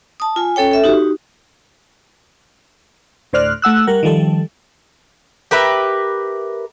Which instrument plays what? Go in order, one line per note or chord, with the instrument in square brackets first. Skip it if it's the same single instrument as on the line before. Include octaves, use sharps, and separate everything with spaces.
[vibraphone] A5 D#6
F4 G#5
C#4 A4 C#5 G5
A4 E5
D#4 F#4 G4
[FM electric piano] D2 A2 C5 D5 F6 F#6
A3 F#5 E6 F#6
G3 A#4 F#5
D#3 F3 G3 A4
[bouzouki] G4 A#4 B4 E5